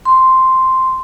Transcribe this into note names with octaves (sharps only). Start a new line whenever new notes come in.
C6